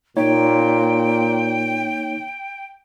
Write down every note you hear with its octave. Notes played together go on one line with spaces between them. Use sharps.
A#2 A#3 D#4 C#5 G5